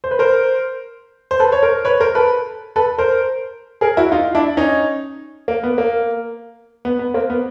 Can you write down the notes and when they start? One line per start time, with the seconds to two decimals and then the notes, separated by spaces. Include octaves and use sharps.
0.04 C5
0.11 B4
0.19 A#4 C5
1.31 C5
1.40 A4 B4
1.52 C#5
1.63 A#4 C5
1.85 B4 C#5
2.00 A#4 C5
2.15 A4 B4
2.76 A4 B4
2.98 A#4 C5
3.81 G#4 A#4
3.97 E4 F#4
4.12 D#4 F4
4.35 D4 E4
4.57 C#4 D#4
5.48 A#3
5.63 B3
5.78 A#3
6.85 B3
6.99 B3
7.14 A#3 C4
7.30 B3